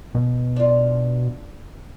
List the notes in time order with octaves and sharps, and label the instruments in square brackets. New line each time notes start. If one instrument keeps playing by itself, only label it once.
[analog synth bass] B2
[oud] D4 F4